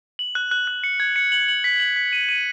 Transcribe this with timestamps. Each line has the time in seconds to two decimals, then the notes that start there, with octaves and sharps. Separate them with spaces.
0.19 F#7
0.35 F#6
0.51 F#6
0.67 F#6
0.84 C#7
1.00 G#6
1.16 C#7
1.32 F#7
1.48 F#7
1.64 B6
1.80 F#7
1.96 B6
2.13 D#7
2.29 D#7